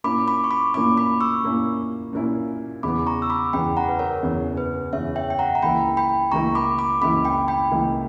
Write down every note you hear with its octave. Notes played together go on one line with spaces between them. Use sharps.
A#2 A#3 C#4 E4 B5 D6
B5 D6
C#6
B5 D6
A#2 A#3 C#4 E4 B5 D6
B5 D6
C#6 E6
A#2 A#3 C#4 E4
A#2 A#3 C#4 E4
E2 C#3 E3 B3 B5 D6
A#5 C#6
E6
B5 D6
E2 C#3 E3 B3 G5 B5
F#5 A#5
B4
A#4 C#5
E2 C#3 E3 B3
B4
E2 C#3 E3 B3 C#5 E5
E5 G5
G5
F#5 A#5
A#5
C#2 C#3 E3 A#3 E4 G5 B5
G5 B5
C#2 C#3 E3 A#3 E4 A#5 C#6
B5 D6
B5 D6
C#2 C#3 E3 A#3 E4 B5 D6
G5 B5
G5 B5
C#2 C#3 E3 A#3 E4